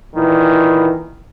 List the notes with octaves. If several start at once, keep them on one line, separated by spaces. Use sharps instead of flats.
A#2 D#3 E3